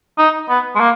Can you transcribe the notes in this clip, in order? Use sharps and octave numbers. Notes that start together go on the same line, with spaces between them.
D#4
B3
G#3
A#3